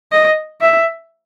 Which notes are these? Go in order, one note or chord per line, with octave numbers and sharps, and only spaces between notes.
D#5
E5